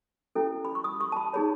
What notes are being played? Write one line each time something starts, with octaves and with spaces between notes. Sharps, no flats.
C#4 E4 A4
B5
C#6
D#6
C#6
A5
B5
D#4 G#4 C#5 B5